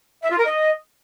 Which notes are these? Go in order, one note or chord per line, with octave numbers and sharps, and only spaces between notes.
E5
F4
A#4
D#5